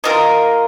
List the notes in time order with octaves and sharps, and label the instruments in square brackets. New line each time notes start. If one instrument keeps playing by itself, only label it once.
[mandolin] F4 A#4 D#5